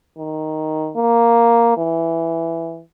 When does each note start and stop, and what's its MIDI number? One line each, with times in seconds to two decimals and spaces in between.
0.18 0.91 51
0.96 1.77 58
1.77 2.81 52